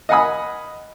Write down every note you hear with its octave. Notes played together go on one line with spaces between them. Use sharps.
D#5 F5 F#5 G#5 B5 D#6